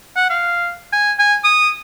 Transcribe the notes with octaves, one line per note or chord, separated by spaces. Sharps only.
F#5
F5
G#5
G#5
D#6